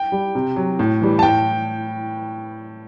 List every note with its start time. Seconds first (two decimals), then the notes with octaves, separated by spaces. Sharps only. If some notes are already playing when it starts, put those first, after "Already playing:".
Already playing: G5
0.12 G3
0.35 C3
0.56 F#3
0.79 A2
1.01 E3 G3
1.19 A5
1.23 A2 G5